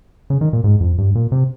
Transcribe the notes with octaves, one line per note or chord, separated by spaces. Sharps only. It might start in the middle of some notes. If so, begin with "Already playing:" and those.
C#3
D#3
A#2
G#2
F2
G2
A#2
C3